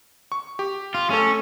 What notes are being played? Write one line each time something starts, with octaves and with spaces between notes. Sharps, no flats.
C#6
G4
F4
A3 C#4 A4